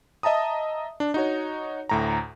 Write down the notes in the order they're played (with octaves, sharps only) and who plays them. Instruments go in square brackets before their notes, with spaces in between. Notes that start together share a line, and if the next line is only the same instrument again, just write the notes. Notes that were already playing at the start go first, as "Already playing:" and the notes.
[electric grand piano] D#5 E5 A5 A#5 D#6
D4
D#4 F#4 C#5
D2 A2 A#5